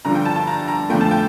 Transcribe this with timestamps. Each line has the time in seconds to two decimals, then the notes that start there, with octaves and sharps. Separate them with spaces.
0.05 G2 D3 F3 A#5
0.15 G5
0.25 A5
0.36 A5
0.47 A#5
0.68 A#5
0.89 F2 D3 F3 A3 G5
1.01 A5
1.11 G5